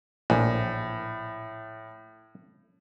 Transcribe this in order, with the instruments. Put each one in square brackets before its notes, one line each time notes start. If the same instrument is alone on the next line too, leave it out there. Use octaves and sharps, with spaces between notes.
[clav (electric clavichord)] A#1 [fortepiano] A2